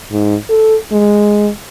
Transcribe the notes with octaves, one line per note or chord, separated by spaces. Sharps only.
G#2
A4
G#3